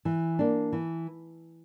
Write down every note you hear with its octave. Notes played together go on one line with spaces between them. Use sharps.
E3
A#3 D4
E3